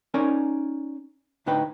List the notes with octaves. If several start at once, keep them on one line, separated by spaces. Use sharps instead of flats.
C#4 D#4 A#4 D5 G#5
D2 A2 D4 D#4 B4 G5